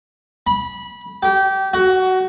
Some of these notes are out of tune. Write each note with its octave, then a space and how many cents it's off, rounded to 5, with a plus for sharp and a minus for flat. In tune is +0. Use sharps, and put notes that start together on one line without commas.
B5 -20
G4 -25
F#4 +15